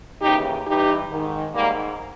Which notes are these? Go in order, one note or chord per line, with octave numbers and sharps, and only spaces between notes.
D#2 C#3 E3 D#4 G4
G2 E3 D#4 G4
G#2 D#3
G#2 D#3 G3 A#3